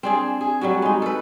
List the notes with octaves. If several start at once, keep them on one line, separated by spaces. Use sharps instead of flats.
C4 D4 G#4
G#4
F#3 G3 A3 F#4
G#3 D#4
A4 B4